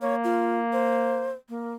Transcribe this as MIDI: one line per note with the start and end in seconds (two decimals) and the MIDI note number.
0.02 1.34 58
0.02 0.15 73
0.24 0.60 65
0.73 1.31 72
1.49 1.74 58